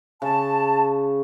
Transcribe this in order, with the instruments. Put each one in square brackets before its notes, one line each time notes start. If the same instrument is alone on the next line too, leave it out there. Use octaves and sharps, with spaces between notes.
[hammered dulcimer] C#3 [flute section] A5